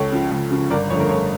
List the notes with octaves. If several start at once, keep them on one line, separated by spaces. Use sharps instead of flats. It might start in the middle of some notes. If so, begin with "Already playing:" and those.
Already playing: C#2 A4 C#5
C#3 F3
C#2
C#3 F3
G1 A#4 D5
F2 D3 A3 C#5
A#4
G1 A4 C#5